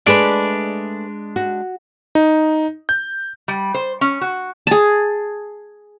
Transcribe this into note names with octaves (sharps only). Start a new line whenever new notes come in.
G#3 A3 D4 G#4 B4 D5
F#4
D#4
G6
G3
C5
C#4
F#4
G#4 A5